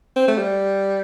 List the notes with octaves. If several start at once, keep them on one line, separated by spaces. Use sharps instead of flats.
C4
A3
G3